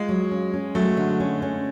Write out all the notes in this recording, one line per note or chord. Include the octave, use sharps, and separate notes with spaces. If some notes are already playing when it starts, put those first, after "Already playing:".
Already playing: G#3 F4
F#3
C#4
C#4
F#3 A3
D3
C#4
C#4